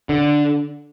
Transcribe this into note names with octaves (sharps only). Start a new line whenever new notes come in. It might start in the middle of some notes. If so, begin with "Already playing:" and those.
D3